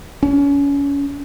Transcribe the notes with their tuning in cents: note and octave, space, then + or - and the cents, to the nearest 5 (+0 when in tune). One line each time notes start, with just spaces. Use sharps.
C#4 +30